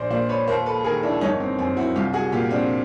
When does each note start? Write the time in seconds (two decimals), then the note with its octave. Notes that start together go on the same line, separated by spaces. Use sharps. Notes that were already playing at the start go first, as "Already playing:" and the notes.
Already playing: A#1 C5 D5
0.10 A#2 C5 D5
0.29 B4 C#5
0.48 D#2 A#4 C5
0.66 A4 B4
0.84 D#3 G#4 A#4
1.03 D4 E4
1.21 G1 C#4 D#4
1.40 C4
1.59 F#2 C4
1.77 E4 F#4
1.96 C2 F4 G4
2.13 F#4 G#4
2.32 A#2 F4 G4
2.51 C4 D4